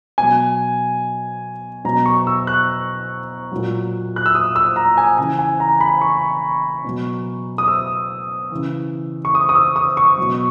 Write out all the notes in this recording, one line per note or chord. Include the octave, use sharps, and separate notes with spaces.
B2 F#3 G#5
B2 F#3 A#5
C#6
E6
F#6
A#2 F#3
F#6
E6
D#6
E6
A#5
G#5
C#3 E3 G#5
G#5
A#5
B5
C#6
B2 F#3
D#6
E6
C#3 E3
C#6
D#6
D#6
E6
D#6
C#6
B2 F#3